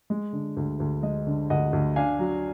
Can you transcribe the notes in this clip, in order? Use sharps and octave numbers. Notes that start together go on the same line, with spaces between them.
G#3
D3
D2
D2
G#3 D#5
D3
D2 D#5 F#5
D2
D4 F5 G#5
F#3